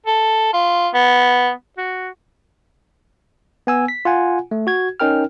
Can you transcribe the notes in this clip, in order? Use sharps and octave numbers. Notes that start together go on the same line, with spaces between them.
A4
F4
B3
F#4
B3 G#5 E6
B6
F4 F#5 G#5
A3
F#4 G#6
C#4 D#4 A#4 G5 F6